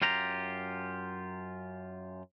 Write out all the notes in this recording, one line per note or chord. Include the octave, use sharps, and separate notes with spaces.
F#2 F4 G4 A#5